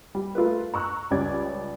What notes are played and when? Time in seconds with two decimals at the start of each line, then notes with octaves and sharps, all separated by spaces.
0.15 G3
0.35 A3 F4 A#4 B4
0.74 A#5 C#6 E6 F#6
1.11 C#2 G3 C#4 D5 G#6